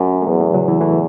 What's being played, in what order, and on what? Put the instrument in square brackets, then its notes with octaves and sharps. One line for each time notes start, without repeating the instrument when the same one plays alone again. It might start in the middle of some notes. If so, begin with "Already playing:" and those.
Already playing: [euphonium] F#2 [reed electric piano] A3
[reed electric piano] A3
[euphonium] E2 [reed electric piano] F#3 B3
[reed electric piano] E3 A3
C#3 F#3
E3
E3 A3